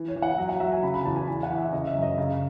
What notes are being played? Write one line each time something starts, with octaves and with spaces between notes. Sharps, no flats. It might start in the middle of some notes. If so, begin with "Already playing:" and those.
Already playing: E3
C#5
E3
F#5
F#3
F#5
F#3 E5
G#5
C#3 B5
B5
E2 A5
G#5
E3 G#5
F#5
E3
E5
C#3 D#5
E5
F#2
D#5
C#3